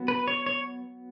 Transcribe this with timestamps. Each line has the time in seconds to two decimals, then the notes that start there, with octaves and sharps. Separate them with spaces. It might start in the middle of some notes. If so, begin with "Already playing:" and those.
Already playing: F#3 B3
0.08 B4
0.28 C#5
0.46 C#5